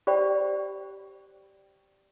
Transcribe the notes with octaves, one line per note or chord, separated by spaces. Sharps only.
G4 C5 D5 G5 B5